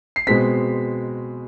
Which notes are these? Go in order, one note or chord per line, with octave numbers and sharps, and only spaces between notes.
C7
B2 G#3 C4 B6